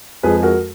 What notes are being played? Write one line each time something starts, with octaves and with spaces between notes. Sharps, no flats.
F2 F3 G#3 G#4 B4
G#4
F#4 A#4